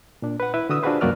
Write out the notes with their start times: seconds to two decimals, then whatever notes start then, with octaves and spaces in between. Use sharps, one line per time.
0.22 A#2 D4
0.40 B4 F#5
0.54 E4 B4 E5
0.70 D3 F#4 D#6 E6
0.83 D4 F4 F#4 G#4 B4 C5
1.01 C2 F#2 A#3 F#4 D5 F6